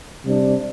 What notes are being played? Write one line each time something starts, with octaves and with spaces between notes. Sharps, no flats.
C3 G3 D4